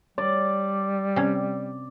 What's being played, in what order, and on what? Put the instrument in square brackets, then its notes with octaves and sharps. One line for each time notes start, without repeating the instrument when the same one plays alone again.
[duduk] G3 [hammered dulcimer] D5
[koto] C3 C#4